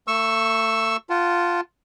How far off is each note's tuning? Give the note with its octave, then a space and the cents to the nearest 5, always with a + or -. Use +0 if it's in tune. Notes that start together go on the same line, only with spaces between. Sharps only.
A3 +35 C#6 -10 E6 +0
F4 +0 F#5 +20 A5 +5